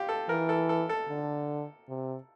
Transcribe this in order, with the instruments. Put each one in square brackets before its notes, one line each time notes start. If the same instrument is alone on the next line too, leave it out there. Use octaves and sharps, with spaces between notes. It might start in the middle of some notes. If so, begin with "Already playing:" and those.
Already playing: [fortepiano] F4 G4
A4
[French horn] E3 [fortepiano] A#4
[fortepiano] A4
A4
A4
[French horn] D3
C3